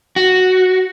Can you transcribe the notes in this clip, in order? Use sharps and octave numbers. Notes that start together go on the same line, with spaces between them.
F#4